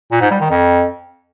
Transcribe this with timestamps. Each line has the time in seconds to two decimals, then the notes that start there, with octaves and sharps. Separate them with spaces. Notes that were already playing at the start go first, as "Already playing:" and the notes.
0.12 A#2
0.21 G#2
0.31 G3
0.41 D#3
0.50 F2